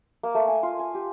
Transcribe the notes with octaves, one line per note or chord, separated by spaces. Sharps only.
A#3
A3
G#5
F4
G#5
G4